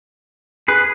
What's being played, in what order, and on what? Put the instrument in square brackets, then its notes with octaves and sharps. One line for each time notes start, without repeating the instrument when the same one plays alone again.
[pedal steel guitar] G#4 B4